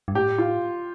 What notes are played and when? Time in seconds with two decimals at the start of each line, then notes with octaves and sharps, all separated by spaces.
0.08 G2
0.15 A2 G4
0.38 F4